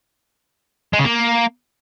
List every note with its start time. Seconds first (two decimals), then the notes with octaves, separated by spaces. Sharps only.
0.93 G#3
0.99 C#3
1.04 A#3